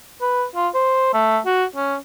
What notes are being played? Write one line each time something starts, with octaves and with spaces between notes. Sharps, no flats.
B4
F4
C5
A3
F#4
C#4